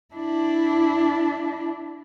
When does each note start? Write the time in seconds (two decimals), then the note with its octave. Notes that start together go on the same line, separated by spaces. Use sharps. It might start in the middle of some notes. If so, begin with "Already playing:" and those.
0.15 D4 E4